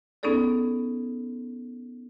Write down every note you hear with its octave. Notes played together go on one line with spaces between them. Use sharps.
B3 C#4 D#4 G#4 A4 D5